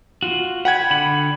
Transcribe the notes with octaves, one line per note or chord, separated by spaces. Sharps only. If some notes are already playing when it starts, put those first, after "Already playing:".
F4 F#4
F#5 G5 B5 G#6
D3 B5